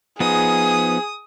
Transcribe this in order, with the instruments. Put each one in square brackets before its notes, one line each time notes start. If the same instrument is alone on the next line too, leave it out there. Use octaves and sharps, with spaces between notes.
[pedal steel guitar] F3 B3 D#4 [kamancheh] G#4 [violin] D#6